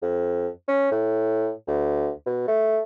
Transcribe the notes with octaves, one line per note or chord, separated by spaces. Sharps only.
F2
C#4
A2
D2
B2
A3